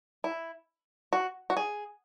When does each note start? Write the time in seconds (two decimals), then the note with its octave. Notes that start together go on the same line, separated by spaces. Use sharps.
0.24 E4
1.13 F#4
1.50 F#4
1.57 G#4